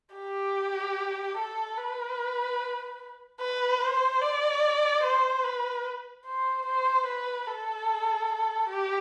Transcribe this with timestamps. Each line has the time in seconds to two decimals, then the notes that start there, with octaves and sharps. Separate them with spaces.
0.15 G4
1.38 A4
1.78 B4
3.41 B4
3.82 C5
4.22 D5
5.04 C5
5.44 B4
6.26 C5
6.66 C5
7.07 B4
7.47 A4
8.69 G4